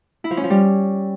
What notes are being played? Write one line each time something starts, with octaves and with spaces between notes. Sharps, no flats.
E4
F3
C#4
F3
G3